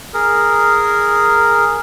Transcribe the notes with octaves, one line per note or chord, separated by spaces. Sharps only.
G#4 A#4